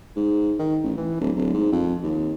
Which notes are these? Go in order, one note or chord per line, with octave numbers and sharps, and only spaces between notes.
G#2
D#3
A1
E3
D1
D1
G#2
F2
D#2